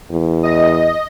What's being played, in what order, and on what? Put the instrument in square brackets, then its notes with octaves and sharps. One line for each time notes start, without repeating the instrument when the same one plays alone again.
[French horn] E2
[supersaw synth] D#5